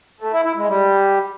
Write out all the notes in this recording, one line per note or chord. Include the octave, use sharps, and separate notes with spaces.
A3
E4
E4
G#3
G3